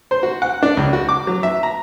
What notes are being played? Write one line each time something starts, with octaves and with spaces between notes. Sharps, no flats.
C5
F#4
F#5
D4
C#2
F#4
D6
F#3
E5
A#5